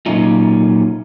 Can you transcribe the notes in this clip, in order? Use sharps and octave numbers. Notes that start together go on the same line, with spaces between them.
A#2 F#3 A#3 C#4 D#4 F4